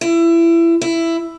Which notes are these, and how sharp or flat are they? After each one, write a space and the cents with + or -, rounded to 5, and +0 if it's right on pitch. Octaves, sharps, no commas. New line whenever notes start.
E4 +25
E4 +10